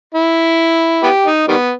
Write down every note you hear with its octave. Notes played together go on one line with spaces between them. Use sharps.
E4
B3 E4 G4
D#4
D#3 G3 B3